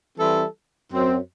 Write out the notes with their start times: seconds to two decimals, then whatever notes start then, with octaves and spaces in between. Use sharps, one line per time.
0.18 E3 G3 C4 E4 A4
0.92 F#2 F#3 C4